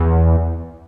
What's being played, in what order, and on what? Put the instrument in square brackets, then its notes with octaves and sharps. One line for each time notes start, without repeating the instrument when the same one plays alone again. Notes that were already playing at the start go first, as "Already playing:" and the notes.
Already playing: [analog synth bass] E2